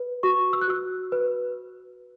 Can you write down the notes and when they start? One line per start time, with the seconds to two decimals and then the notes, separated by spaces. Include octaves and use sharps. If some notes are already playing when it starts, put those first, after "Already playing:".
Already playing: B4
0.23 F#4 C#6
0.53 E6
0.61 F#6
0.68 F#4 E6
1.12 B4